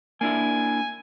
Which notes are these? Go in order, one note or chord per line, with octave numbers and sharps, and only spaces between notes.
A#3 D4 E4 G#5